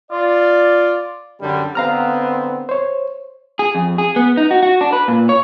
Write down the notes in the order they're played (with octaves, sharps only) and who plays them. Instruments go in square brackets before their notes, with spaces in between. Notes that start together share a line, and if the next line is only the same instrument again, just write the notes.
[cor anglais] F4 [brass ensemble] D5
[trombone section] F#2 D3 G3
[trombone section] D3 B3 C4 [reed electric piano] F5 A#5 F6
[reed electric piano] C5 C#5
[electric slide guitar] G#4
F2
G#4
B3
D#4
F#4
F#4
D4
B4
A#2
C#5